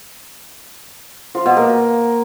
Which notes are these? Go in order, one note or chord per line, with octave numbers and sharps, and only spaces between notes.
F3
B2
A#3